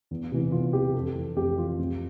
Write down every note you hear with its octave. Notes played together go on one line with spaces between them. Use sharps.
E2
C3 E3
E2 F4
C3 E3 G4
F2 A4
E3
F2 G4
E3 F4
F2